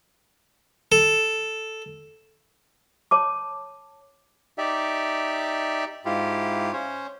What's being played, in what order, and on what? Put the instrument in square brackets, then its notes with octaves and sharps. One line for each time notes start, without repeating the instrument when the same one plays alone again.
[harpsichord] A4
[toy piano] C#5 A5 D6
[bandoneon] D#4 G4 D5 E5
G#2 E4 F4 G4
C#4 C5 C#5